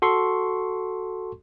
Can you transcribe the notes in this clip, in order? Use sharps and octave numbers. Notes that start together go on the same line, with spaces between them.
F#4 A4 C6 C#6